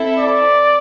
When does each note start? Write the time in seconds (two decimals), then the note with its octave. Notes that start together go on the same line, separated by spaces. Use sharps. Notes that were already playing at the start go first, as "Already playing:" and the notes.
Already playing: C4 E4 A4 E5
0.19 D5